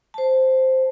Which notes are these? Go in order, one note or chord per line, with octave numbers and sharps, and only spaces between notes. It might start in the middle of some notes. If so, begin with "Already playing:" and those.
C5 A5